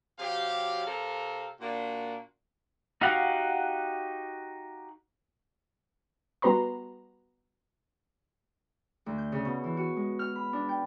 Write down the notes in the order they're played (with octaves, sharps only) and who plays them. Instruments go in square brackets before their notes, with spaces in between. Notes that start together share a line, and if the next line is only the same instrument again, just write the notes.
[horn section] C3 F#3 G4 F5
C3 A4 A#4 F5
A#2 A#3 D4 F#4
[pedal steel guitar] D#4 F#4 G4 F5 F#5
[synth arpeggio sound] G3 B3 F#4 B4 A#5 C6
[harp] D2
G6
C#3
B2
E3
F#4
G#3
F6
B5
D4
G5